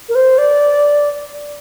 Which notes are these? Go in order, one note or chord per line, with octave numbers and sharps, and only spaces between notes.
A#4
C5
D5